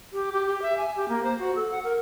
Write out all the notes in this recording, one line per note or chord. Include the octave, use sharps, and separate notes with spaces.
G4
G4
G4
E5
G#5
G4
A#3
C5
F#4
A4
F#5
A#4